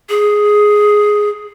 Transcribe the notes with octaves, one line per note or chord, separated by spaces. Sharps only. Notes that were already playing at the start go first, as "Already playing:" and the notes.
G#4